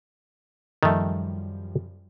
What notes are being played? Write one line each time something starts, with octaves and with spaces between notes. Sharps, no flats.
F#2 D#3 F3 G3 A3